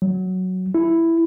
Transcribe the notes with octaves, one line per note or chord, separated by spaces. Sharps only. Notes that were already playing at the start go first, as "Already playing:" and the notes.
F#3
E4